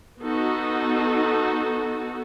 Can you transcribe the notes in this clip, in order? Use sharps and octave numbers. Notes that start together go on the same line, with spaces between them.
B3 D#4 F#4 A4